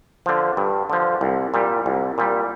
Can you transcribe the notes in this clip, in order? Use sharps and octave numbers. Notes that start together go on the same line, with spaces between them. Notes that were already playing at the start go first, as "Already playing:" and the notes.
D3 F3
G2
D3 F3
C2
A#2 G3
C2
A#2 G3